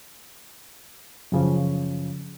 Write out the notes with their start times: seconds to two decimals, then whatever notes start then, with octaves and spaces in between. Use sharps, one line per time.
1.32 F#2 C#3 F3